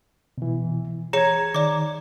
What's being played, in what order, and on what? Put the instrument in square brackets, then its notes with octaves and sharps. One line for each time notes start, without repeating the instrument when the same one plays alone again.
[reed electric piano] B2 E3
[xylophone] G#4 C#5 C#7 [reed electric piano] A#5 G#6
[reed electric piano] D#3 [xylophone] D5 D6